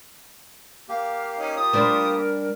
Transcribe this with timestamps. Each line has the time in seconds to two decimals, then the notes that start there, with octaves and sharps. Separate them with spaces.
0.89 A#3 G4 F5
1.38 C#4 D#4
1.57 F4 D#6
1.73 G3 D4 A#4 C5